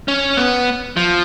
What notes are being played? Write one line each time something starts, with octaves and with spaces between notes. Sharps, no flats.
C#4
B3
F3